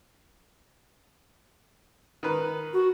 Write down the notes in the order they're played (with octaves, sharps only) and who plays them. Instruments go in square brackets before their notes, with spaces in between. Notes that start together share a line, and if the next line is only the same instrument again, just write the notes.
[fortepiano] D#3 B4
[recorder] F#4